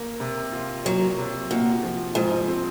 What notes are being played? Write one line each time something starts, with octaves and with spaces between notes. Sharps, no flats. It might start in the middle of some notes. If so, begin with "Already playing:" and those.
Already playing: A#3
C3
F4
F#3 A#3
C3
A#2 F#4
F3
G#2 F3
C4